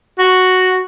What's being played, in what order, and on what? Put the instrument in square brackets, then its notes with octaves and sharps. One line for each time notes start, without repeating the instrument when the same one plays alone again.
[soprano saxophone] F#4